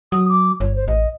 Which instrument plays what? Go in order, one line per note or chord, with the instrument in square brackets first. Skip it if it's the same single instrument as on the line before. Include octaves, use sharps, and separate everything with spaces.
[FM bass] F#3 [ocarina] D#6
[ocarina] D6
[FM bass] G1 [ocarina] C#5
[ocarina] C5
[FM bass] A1 [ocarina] D#5